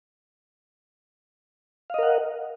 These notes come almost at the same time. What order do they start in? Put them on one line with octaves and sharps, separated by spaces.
F5 D#5 A#4 F#5